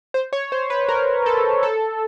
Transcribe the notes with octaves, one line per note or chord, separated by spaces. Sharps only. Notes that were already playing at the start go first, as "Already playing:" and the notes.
C5
C#5
C5
B4
A#4
A4
A4